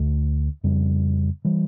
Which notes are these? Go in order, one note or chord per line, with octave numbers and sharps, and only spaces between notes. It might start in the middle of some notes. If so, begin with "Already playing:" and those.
Already playing: D2 D3 A3
F2 C#3 G3
E3 G3